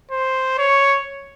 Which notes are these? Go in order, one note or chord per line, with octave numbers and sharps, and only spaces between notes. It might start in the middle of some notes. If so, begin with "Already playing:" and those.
C5
C#5